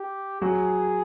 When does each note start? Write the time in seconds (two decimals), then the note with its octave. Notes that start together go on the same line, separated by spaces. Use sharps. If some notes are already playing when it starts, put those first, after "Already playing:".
Already playing: G4
0.41 F#3 F#4 G#4